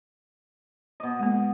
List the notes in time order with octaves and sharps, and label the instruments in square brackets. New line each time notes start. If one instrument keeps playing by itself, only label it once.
[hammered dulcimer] B2 D#5
[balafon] G#3 A#3